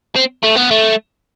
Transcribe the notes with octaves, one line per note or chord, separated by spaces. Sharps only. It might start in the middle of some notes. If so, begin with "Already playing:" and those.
C4
A3
B3
A3